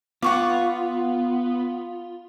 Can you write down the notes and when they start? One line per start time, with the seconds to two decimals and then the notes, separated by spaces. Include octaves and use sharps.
0.22 B3 F4 F#5 C#6 D6